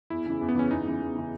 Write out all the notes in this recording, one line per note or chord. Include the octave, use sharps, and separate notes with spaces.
E2 E4
C#3 E3
E2
B3
C#3 E3 C#4
E2 D#4
C#3 E3
E2
C#3 E3